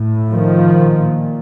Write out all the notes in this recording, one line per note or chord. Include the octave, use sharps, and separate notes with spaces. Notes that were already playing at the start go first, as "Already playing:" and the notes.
Already playing: A2
D#3 F3
A#2